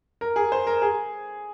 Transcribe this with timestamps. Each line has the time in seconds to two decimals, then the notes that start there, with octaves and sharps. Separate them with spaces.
0.21 A#4
0.36 G#4
0.52 C5
0.67 A#4
0.82 G#4